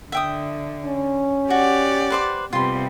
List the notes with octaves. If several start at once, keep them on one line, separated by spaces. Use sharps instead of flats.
D3 E5 G5 D#6
C#4
F#4 G4 D5 F#5
B4 C5 D6
C3 G3 B3 F4 C6